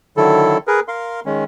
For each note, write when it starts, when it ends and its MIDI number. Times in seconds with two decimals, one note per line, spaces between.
0.17 0.58 50
0.17 0.58 51
0.17 0.58 54
0.17 0.58 64
0.17 0.58 69
0.67 0.80 68
0.67 0.80 70
0.67 0.80 71
0.88 1.20 70
0.88 1.20 77
0.88 1.20 84
1.26 1.44 51
1.26 1.44 56
1.26 1.44 61